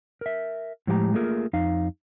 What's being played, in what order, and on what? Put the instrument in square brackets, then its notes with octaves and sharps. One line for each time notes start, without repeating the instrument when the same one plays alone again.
[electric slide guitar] A#4 E5
A2 F3 G#3 G4 G5 A#5
A3 A#3 F4 G#4 A#4
F2 D#4 F5